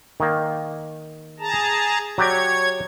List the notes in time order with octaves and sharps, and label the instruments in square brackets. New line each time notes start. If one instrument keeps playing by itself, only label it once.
[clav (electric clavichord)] D#3 A#3
[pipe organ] G#4 A5 A#5
[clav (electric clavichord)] F#3 G4 D5 [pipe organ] C#5 G#6